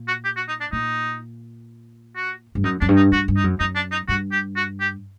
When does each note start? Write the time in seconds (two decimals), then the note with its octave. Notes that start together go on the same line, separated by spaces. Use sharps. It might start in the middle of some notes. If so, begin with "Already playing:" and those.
Already playing: A#2
0.08 F#4
0.25 G4
0.37 F#4
0.48 D#4
0.61 D4
0.72 A#2 D#4
2.16 F#4
2.55 G2
2.64 F#2 D#4
2.81 F#2 D4
2.89 G2
2.96 D#4
3.12 G2 F#4
3.28 G2
3.36 D#4
3.44 F#2
3.60 F#2 D#4
3.76 D4
3.92 D#4
4.08 G2 F#4
4.32 G4
4.56 F#4
4.80 G4